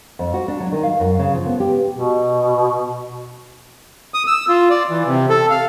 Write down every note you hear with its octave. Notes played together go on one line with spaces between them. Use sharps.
F2
F#4
D4
F#3
D#3
F5
F#2
C#3
F3
B3
G4
B2
D#6
E6
F4
D5
E3
C3
A4
F5